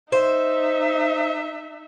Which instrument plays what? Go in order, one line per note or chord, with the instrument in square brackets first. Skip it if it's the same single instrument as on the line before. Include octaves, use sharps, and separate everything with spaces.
[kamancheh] D#4 E5 [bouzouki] C5